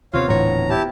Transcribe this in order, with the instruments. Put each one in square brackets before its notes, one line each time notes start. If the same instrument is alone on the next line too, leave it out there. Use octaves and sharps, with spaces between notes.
[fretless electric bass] D#2 C3 [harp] B3 C4 F4 [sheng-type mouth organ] C#5 F5
[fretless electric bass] D#1 E3 [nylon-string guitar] A2 D3 C#5 [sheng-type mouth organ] A#5
[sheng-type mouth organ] E4 G4 A5